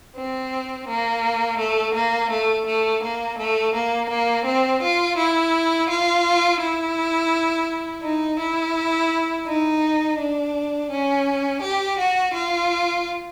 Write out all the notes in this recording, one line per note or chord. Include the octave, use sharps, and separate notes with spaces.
C4
A#3
A3
A#3
A3
A3
A#3
A3
A#3
A#3
C4
F4
E4
F4
E4
D#4
E4
D#4
D4
C#4
G4
F#4
F4